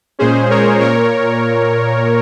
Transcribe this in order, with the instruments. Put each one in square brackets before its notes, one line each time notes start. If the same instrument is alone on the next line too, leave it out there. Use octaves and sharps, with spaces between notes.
[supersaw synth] A#2 G#3 C#4 G#4 C5
A#4 C#5
A#2 A#4 C#5